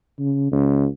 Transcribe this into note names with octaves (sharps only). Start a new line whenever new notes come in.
C#3
C#2